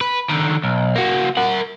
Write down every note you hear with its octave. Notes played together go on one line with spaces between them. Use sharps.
B4
D3 D#3
B1
A#3 F#4
A#4 F#5